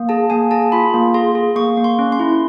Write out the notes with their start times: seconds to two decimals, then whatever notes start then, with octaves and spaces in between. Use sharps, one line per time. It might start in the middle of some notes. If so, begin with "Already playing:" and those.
Already playing: A#3
0.09 G#4 A5
0.30 A#3 G#5
0.51 G#4 A5
0.72 F4 B5
0.94 A#3
1.14 G#4 C6
1.35 G#4
1.56 A#3 C#6
1.77 A#3
1.84 C6
1.99 C#4
2.12 C6
2.20 E4